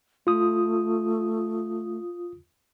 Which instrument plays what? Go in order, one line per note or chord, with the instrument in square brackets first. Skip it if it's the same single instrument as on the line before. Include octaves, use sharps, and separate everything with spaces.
[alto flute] A3 [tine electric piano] F4 D#6